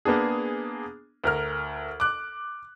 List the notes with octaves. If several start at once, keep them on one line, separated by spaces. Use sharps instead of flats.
A#3 B3 D4 G#4
D2 A#4 F6
D6 F#6